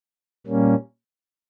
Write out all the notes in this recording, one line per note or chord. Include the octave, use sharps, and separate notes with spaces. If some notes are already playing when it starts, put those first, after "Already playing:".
A#2 G3 A#3 C#4